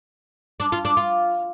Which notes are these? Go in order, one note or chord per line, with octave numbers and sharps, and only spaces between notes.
D4
F4
D4
F4